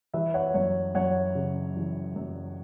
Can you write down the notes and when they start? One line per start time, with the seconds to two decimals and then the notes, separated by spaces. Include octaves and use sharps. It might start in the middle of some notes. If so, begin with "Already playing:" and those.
0.14 E3 B4 E5
0.34 C#5 F#5
0.54 F#2 C#5
0.95 F#2 C#5 F#5
1.35 C#3
1.76 E3
2.16 F#2